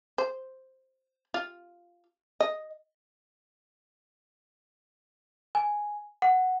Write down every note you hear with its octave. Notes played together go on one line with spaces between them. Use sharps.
C5
F4
D#5
G#5
F#5